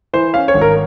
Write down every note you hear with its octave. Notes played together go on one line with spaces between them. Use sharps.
E3 C5
C#4 F5
C#5
G#1
A#4